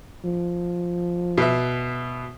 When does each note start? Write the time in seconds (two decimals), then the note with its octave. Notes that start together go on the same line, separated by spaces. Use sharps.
0.24 F3
1.38 B2 B4 E5